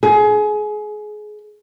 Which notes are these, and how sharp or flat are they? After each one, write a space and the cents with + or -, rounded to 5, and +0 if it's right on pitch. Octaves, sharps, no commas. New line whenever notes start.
G#4 +25